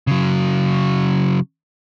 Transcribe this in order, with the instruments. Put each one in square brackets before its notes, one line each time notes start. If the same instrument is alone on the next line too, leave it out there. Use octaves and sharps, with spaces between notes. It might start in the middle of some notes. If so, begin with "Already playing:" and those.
[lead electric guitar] C#3 F#3